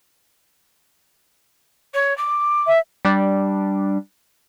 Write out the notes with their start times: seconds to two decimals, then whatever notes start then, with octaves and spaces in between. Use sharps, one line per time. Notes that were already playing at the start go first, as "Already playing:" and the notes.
1.94 C#5
2.18 D6
2.67 E5
3.05 G3 D4